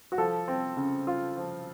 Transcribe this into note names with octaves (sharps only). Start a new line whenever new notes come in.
F#4
F3 A4
C4
C#3
F4
F3